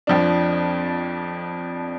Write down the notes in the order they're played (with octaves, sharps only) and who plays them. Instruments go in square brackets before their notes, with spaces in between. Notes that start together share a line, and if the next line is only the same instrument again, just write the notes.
[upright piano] F2 F3 D4